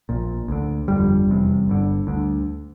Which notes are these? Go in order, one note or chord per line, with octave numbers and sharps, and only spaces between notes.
A#1 A#2
D2 D3
G1 F2 D3 G3
F1 E2 C3
G1 G2 D3
D2 D3